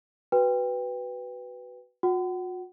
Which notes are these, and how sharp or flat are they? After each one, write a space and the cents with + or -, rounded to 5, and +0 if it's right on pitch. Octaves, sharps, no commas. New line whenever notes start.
F#4 +10 B4 +0 G5 +20
F#4 -45 F#5 +35